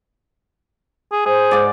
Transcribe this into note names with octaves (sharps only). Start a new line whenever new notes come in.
G#4
G#4 C5
G#2 D5